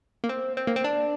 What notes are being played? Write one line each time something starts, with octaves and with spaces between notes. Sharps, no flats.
A#3
C4
C4
A#3
C4
D4